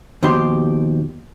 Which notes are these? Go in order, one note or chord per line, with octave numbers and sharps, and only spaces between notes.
D#2 B2 F3 G4 C6